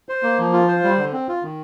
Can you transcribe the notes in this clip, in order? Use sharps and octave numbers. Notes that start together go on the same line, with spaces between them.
C5
A#3
F3
F4
C5
G3
D3
C4
F4
D#3